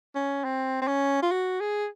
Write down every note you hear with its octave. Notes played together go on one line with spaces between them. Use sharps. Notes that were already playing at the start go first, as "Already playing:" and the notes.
C#4
C4
C4
C#4
F4
F#4
G#4